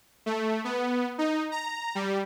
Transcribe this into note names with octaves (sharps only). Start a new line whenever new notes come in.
A3
B3
D#4
A#5
G3